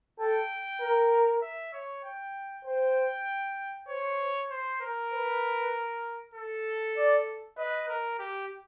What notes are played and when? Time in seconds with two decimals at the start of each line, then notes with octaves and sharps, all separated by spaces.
0.19 A4 G5
0.81 A#4
1.42 E5
1.73 C#5
2.04 G5
2.65 C5 G5
3.88 C5 C#5
4.50 C5
4.81 A#4
5.12 B4
6.34 A4
6.96 D5
7.57 B4 D#5
7.88 A#4
8.19 G4